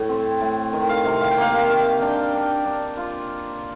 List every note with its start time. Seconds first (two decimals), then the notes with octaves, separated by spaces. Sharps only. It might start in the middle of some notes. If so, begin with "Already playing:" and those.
Already playing: A2 A3
0.09 C4
0.40 A2
0.73 D#3
0.89 F5
1.05 C3 F5
1.21 F5
1.31 G5
1.37 A#3 F5
1.70 D#3
2.01 D4 G5
2.33 D4
2.65 D4
2.97 F4